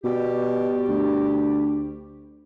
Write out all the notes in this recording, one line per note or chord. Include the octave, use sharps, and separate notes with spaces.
B2 G3 F#4 G4
D2